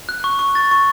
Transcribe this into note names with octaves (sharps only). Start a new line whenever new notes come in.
F#6
C#6
C#6
A6
C#6